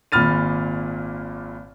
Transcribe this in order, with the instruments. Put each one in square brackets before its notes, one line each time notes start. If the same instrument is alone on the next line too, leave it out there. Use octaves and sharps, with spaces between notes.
[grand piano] G#1 A#2 B5 F6 A6 D#7